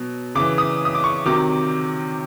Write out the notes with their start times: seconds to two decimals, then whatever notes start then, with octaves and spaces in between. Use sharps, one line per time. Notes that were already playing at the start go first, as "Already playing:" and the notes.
Already playing: B2 F#3
0.35 C#3 E3 D6
0.58 D#6
0.85 D#6
0.95 D6
1.04 C#6
1.26 C3 D#3 F#3 D6